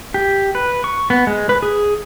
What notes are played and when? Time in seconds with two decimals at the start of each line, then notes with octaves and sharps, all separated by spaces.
0.14 G4
0.55 B4
0.84 C#6
1.10 B3
1.27 G#3
1.49 B4
1.63 G#4